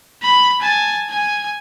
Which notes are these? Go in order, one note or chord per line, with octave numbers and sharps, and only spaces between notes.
B5
G#5 A5
G#5